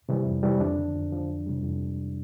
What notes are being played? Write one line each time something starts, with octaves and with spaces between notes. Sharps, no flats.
C3 E3 G3
F2
C3 E3 G3
F2 D4
D3 F3
F2
D3 F3
F2
C3 E3 G3
F2